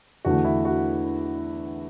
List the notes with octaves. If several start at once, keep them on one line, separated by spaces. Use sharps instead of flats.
E2 D3 A3 F#4
E4
F#4